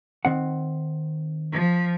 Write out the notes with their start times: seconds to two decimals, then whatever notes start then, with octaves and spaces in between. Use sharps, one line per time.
0.25 D#3 C4 F#5
1.52 F3